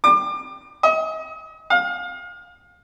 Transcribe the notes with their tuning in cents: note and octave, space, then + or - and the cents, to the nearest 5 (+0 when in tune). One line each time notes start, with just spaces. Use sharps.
D6 +30
D#5 +40
F5 +30